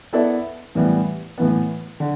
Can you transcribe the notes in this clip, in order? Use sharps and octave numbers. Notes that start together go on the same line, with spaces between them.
B3 E4 A4 D5
A2 E3 G3 B3
A2 E3 B3
D3